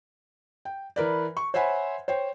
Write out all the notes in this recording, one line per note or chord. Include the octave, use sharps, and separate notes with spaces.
G5
E3 A#4 B4 D5
C#6
C5 C#5 E5 F#5 G#5 B5
C5 C#5 G5